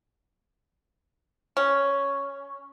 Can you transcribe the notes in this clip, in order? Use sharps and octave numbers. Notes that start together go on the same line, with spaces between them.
C#4